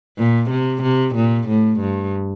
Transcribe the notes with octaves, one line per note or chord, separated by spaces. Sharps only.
A#2
C3
C3
A#2
A2
G2